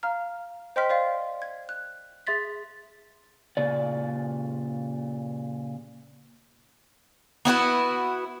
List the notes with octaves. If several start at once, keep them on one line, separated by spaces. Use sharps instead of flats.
F5 A#5 F6
C5 D#5 G5 C6 F6 B6
C5 D5 F5 C6
G#6
F#6
G#4 E5 C6 A6 B6
A#2 C#3 D5
B3 E4 F#4 B4